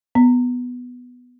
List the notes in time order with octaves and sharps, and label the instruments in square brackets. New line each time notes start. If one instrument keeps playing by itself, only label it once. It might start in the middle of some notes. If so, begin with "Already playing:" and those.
[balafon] B3